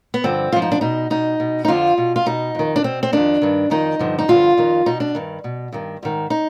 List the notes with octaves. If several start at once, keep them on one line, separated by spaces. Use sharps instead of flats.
B3
G2 D3 F3 C4
G#2 F3 F4
D#4
D4
B2 D#4
B2 D#4
B2
D#4
F2 D3 F3 F4
B2
F4
B2 D#4
F2 D#3
D4
B2 C4
C4
F2 D#3 D4
G2 D#3
F2 D#3 D#4
G2 D3 F3
D#4
G2 D3 F3 F4
F2 D#3
B2 D#4
D4
G2 D#3
B2
G2 D#3
G#2 D#3
D#4